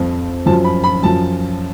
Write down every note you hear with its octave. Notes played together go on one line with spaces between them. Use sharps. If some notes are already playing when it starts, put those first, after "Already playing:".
Already playing: F2 F3
F#2 F3 A5
B5
B5
F#2 F3 A5